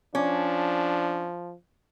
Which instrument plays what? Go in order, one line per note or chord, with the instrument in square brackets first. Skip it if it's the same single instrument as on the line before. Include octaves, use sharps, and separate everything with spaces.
[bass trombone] F3 [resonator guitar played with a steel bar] C#4 [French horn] D4